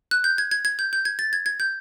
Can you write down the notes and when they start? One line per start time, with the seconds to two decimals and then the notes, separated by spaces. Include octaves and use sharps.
0.11 F#6
0.24 G6
0.38 G#6
0.51 G#6
0.65 G#6
0.79 G6
0.93 G6
1.05 G#6
1.19 A6
1.33 G#6
1.46 G#6
1.60 G6